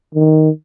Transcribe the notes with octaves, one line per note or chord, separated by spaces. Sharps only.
D#3